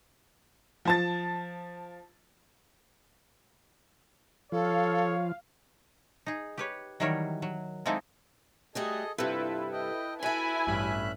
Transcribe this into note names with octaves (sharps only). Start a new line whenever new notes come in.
F3 A5 A6
F3 A4 C#5 F5
D#4 G#4
G4 B4 C#5
D#3 E3 F#3 G3 A#4 C#5
F#3
G#3 A#3 C4 D#4 E4 A4
G3 A3 F#4 G#4 A4 D#5
G2 C3 E4 F4 A4 B4
D#5 G5
E4 F#4 A4 B4 G#5 B5
A1 G2 C#4 E5 B5 F#6